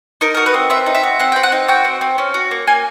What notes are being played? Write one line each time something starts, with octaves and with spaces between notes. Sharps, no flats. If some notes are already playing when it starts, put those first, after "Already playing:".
D#4 A#4
F#4 A#4
B4
C4
C4 E5
D#4
E5
F#4
C4 F#5
C4 G5
F#5
D#4
F#4 G5
C4
C4
C#4
F#4
A#3
A#3 G#5